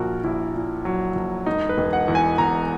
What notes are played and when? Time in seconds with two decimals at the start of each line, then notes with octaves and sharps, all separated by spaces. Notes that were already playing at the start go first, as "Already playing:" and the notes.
Already playing: A#1 A#2 F#4 A#4
0.24 A#1 E4
0.55 A#2
0.85 F#3
1.15 A#1
1.46 E1 D#4
1.69 B4
1.77 E1
1.93 F#5
2.08 E2
2.15 G#5
2.38 E2 A#5